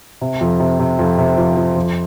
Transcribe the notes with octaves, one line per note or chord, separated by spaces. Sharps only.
C3
F2
C3
C3
F2
C3
F3
F3
F2